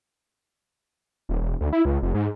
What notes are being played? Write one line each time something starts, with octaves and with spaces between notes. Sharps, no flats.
D#1
E1
D2
E4
C#2
F1
G#2